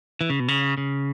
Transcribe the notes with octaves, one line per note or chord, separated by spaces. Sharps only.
E3
C#3
B2
C#3
C#3